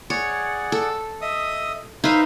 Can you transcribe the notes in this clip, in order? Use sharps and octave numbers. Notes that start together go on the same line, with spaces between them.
G#4 C#5 D5 F#5
A4
D#5 E5 D#6
D#4 B4 C5 E5 F5